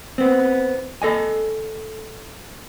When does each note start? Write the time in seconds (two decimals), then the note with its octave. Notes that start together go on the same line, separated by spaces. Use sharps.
0.18 B3 C4
1.02 A4 D#5 G#5